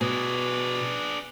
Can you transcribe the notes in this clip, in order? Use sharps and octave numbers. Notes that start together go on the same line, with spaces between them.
B2 D4 G#4